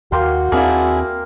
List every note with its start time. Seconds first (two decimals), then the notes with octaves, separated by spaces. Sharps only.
0.12 D#2 A#3 F#4 G5 C6
0.52 D#2 A#3 C4 D4 E4 G#4